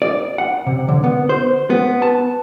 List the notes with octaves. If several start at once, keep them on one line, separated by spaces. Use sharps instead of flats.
D5
F#5
C3
D3
B3
C5
B3
A5